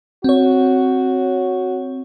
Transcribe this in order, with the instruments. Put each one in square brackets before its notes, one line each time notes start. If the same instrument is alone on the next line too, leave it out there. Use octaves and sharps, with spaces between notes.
[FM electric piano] C4 C#5 [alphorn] F#4